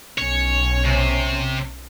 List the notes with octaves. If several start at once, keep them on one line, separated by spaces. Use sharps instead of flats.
B1 C#4 C#5
C3